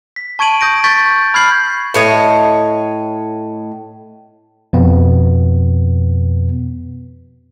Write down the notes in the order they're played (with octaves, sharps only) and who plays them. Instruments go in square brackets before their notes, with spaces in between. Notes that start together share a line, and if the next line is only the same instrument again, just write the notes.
[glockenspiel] B6
A5 C#6 G#6 D7 D#7 F#7
D#6 G6 A#6 D7
C#6 G6 A6 B6
B5 F6 G6 G#6 C7 F#7
[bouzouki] A2 C#5 D#5
[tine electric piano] F2 B2 B3